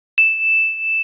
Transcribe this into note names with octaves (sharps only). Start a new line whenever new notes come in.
E7